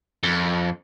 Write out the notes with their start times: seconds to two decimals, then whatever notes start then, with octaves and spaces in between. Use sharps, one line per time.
0.23 F2